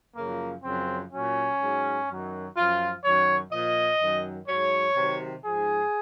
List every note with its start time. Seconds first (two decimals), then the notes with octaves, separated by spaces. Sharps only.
0.16 F#2 C#3 F3 A#3
0.64 F#2 C#3 F3 C4
1.12 A#2 F#3 C#4
1.60 G#2 F#3
2.08 F#2 D#3 F#3
2.56 F#2 F3 F4
3.03 F#2 D#3 F#3 C#5
3.51 A#2 F3 D#5
4.00 F#2 D#3 F#3
4.47 G#2 F#3 C#5
4.96 C3 D#3 F#3
5.44 G#2 F3 G#4